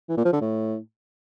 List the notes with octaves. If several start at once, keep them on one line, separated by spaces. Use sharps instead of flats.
E3
A#2
F3
D3
A2